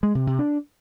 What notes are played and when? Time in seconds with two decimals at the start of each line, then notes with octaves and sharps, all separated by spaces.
0.03 G#3
0.15 C3
0.27 C3
0.39 D4